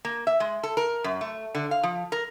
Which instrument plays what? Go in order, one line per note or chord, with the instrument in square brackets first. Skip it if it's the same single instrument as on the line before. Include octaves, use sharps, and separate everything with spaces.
[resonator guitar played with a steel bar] A#3
E5
G#3
A4
A#4
F#2
A3
D3
F5
F3
A#4